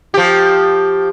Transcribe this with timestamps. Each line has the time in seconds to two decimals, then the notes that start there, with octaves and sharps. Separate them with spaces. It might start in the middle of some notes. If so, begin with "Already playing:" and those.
0.14 F3 G4